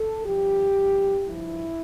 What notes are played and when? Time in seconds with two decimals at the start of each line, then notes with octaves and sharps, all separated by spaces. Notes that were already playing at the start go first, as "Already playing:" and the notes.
Already playing: A4
0.26 G2 F3 G4
0.76 G2 F3
1.25 G2 F3 E4